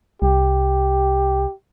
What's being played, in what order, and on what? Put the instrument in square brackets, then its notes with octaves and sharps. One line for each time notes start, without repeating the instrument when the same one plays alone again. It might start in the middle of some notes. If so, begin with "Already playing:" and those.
[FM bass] C2 [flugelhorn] G4